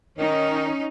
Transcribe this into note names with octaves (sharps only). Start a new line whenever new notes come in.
D#3 C#4 D#4